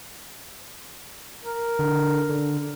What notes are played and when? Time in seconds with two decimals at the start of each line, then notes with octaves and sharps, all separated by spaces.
1.43 A#4
1.79 D3
2.29 D3